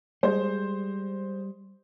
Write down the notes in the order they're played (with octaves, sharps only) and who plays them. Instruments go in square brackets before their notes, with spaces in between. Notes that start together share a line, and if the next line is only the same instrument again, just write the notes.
[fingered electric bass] G3 [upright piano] G#3 C5